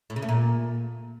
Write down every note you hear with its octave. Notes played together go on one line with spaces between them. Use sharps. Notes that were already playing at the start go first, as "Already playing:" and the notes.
A2
C#3
A3
A#2